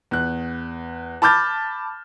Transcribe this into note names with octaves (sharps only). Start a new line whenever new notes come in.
E2 F#6
A5 B5 D6 F6 G6 A6